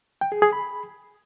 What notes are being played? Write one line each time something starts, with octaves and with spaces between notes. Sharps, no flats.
G5
G#4
G#4
B5